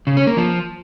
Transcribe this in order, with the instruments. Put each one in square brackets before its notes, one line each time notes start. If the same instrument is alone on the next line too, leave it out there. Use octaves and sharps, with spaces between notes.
[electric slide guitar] C#3
C#4
A#3
F3